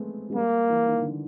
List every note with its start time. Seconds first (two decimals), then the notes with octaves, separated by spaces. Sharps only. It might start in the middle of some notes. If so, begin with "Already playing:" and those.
Already playing: G#3 A3 B3 C4
0.30 G#3
0.35 G3 A#3
0.70 E3
0.87 D#3
1.01 D3